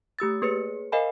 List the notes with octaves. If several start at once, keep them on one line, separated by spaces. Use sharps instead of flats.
A3 G4 E6 A6
A#3 G#4 B4 C#5 C#7
A#4 C5 D#5 F5 G#5 B5